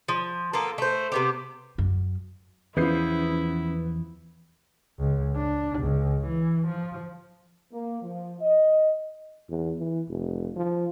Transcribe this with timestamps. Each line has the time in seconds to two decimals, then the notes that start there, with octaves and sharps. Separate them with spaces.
0.08 F3
0.53 A#3 B3 F4 A4
0.78 A3 C5
1.12 C3 B3 G4
1.78 F#2
2.77 E2 F3 B3 C#4 E4 G6 C7
4.99 C#2
5.36 D4
5.79 C#2
6.27 E3
6.68 F3
7.72 A#3
8.02 F3
8.41 D#5
9.49 E2
9.79 E3
10.09 F1
10.56 F3